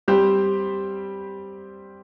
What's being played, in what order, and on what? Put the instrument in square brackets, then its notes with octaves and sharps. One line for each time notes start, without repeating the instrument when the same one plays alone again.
[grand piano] G3 C4 G4 C5